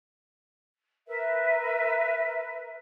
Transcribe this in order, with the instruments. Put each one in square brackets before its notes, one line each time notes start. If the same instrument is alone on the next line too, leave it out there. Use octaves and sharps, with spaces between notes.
[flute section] A#4 B4 E5